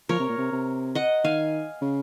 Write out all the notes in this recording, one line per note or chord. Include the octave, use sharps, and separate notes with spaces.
F3 A#4 C#5
C3
A#2
C3
C3
D#5 F#5
D#3 F5 G#5
C#3